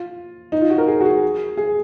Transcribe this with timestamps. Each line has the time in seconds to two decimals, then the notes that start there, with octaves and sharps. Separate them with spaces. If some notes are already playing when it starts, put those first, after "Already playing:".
Already playing: F4
0.52 D#4
0.61 F4
0.70 F#4
0.78 A#4
0.87 G#4
1.01 F#4
1.05 G#4
1.57 G#4